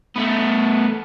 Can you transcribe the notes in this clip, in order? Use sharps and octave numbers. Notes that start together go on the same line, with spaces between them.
A3 B3